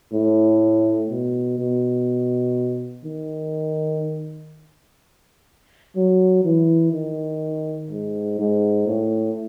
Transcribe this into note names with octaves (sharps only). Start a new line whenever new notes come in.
A2
B2
B2
D#3
F#3
E3
D#3
G#2
G#2
A2